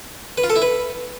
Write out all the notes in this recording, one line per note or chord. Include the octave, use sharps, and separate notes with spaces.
B4
F4
A4
E4
B4